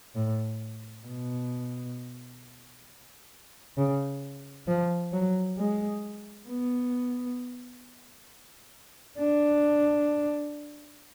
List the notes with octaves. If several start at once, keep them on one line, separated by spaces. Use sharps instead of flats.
A2
B2
C#3
F3
F#3
G#3
B3
D4